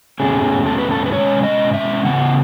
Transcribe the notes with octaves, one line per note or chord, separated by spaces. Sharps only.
E2 B2 A3 C#4 G#4
A4
B4
A4
B4
B2 G#3 C#4 C#5
D#5
E5
C#3 E3 B3 F#5